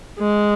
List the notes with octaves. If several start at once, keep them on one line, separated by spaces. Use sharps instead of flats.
G#3